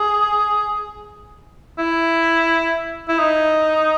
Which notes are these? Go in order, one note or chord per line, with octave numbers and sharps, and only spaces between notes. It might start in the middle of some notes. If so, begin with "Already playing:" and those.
Already playing: G#4
E4
E4
D#4